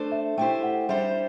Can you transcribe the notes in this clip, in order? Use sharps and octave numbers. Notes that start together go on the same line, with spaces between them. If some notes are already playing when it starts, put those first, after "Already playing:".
Already playing: A3 D4 A4 C5
E5
A3 E4 G4 C5 G5
F#5
G3 D4 G4 C5 E5